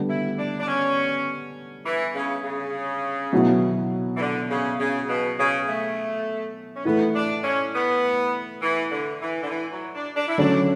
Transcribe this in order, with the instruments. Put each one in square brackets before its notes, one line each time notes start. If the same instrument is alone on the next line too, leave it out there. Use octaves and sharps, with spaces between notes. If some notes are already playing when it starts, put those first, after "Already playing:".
Already playing: [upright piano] D3 G3 B3
[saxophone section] E4
D4
D4
C#4
E3
C#3
C#3
[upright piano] B2 F#3 B3 E4
[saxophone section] E3
D3
C#3
C#3
B2
C#3
A3
C#4
[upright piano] A2 E3 A3 E4 [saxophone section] B3
[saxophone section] D4
C#4
B3
E3
D3
E3
D3
E3
F#3
D4
D4
E4
[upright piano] D3 F#3 C#4 [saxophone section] D4